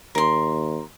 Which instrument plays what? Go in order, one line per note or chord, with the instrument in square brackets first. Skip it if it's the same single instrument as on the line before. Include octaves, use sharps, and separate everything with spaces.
[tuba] D#2 [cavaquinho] A#4 C6